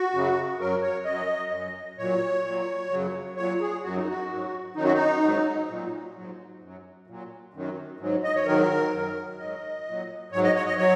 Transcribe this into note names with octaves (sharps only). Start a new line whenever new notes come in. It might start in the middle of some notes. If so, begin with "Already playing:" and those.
Already playing: F#4
F#2 C#3 F#3
F#2 F#3 A#4
C#5
F#2 F#3 D#5
F#2 F#3
A#2 F#3 C#5
A#2 F#3
F#2 C#3 F#3
A#2 F#3 C#5
G#4
F#2 F#3 F#4
D#4
F#4
G#2 F#3
F#2 D#3 F#3 D#4
F#4
D#4
G#2 F#3
A#2 F#3
G#2 F#3
F#2 F#3
A#2 F#3
F#2 D#3 F#3
G#2 F#3
D#5
C#5
G#2 D#3 F#3 A#4
F#2 F#3
G#2 F#3 D#5
A#2 F#3
G#2 F#3 C#5
D#5
C#5
D#5
F#3 C#5